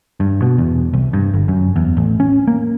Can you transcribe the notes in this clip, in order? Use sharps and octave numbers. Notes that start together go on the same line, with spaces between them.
G2
B2
E2
C2
G2
G1
F#2
E2
A1
C#4
A#3